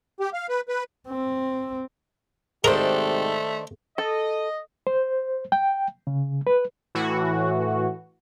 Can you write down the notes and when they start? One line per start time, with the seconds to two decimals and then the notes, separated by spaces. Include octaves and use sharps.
0.20 G4
0.33 F5
0.49 B4
0.69 B4
1.08 C4
2.64 G#2 C3 D#3 A3 D4 G4 A#4 C5
3.98 A4 D#5
4.87 C5
5.52 G5
6.07 C#3
6.47 B4
6.95 A2 E3 F#4